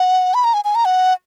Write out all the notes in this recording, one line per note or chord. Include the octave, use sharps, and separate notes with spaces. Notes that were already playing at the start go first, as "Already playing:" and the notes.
Already playing: F#5
B5
A#5
G#5
G#5
A#5
F#5